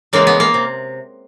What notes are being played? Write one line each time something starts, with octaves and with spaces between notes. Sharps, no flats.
C#3 E3 G#3 A#3
B3
A#3
C3